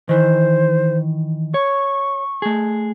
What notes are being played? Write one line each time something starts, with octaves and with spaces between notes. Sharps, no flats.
D#3 E3 C5
C#5 C#6
A3 G#4